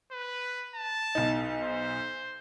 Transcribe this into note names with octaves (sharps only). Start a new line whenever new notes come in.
B4
A5
B1 D#4
C5